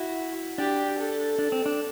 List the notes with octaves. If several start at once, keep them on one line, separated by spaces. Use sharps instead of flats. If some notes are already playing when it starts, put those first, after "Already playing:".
Already playing: E4 F#4
D4 G4
A4
D4
C4
D4